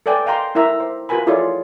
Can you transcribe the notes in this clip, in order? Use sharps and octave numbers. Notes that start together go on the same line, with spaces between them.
A4 B4 D5 G5 G#5
D#5 F5 G5 A#5 C6
D#4 E4 A#4 E5 A#5
C5
F4 F#4 A#4 B4 G#5 B5
E4 F4 G#4 A4 C#5 D5